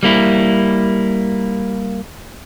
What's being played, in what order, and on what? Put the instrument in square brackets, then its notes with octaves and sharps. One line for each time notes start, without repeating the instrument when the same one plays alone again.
[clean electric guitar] G3 A#3 E4